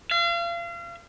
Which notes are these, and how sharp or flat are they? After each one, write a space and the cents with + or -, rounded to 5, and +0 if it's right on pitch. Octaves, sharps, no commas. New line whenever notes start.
F5 -35